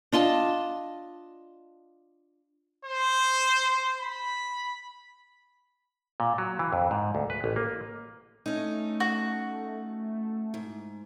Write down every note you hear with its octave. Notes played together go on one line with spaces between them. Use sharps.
D4 F4 D#5 A5
C5
B5
A#2
F#3
E3
F2
G#2
D2
B4
A1
A#3
A3 C#4 D#4
F#4
G#2